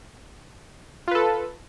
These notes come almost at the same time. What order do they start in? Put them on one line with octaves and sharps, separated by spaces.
F4 B4 A4